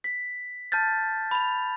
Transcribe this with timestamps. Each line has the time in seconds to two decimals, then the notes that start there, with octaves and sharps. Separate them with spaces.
0.04 B6
0.72 A5 F6 G6 A6
1.31 B5 F7